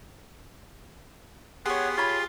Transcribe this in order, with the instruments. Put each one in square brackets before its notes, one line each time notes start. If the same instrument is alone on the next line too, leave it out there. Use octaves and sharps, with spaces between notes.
[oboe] B3 [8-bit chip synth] G4 G#4 C6 [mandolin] C#5 F#5
[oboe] F4 [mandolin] C#5 B5